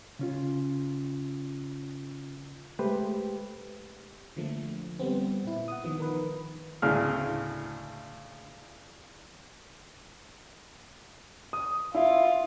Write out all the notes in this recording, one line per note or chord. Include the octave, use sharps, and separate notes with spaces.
C#3 C#4 F4
G#3 A3 G4 B4 C5
D3 F3 A3 A#3
G3 B3 C4
A#2 E4
F#5 D#6
D#3 F3 B3
D#3 A#4 B4
D2 A2 C#3 F6
D#6
E4 F4